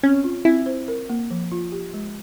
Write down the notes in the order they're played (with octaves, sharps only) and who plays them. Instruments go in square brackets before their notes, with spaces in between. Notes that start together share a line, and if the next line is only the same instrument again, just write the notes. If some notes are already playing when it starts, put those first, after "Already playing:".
[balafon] C4 [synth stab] C#4
[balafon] F4
[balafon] C4 [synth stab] E4
[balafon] C5
A#4
A#3
F3
F4
G4
G#3